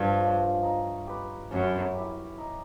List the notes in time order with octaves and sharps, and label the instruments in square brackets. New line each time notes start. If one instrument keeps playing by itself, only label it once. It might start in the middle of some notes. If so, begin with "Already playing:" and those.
Already playing: [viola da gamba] G2 [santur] F3 A3 G4
[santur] G#3 C#4 F4
D#4
G4 B4
[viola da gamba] F#2 [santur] C#4
[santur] E4 G4
D#4